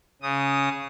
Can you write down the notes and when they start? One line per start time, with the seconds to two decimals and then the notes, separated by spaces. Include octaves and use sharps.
0.22 C#3 D#6